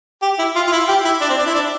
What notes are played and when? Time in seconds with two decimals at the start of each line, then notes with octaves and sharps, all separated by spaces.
0.22 G4
0.39 E4
0.56 F4
0.67 F4
0.72 E4
0.88 G4
1.05 E4
1.21 D4
1.29 C4
1.38 D4
1.46 E4
1.54 D4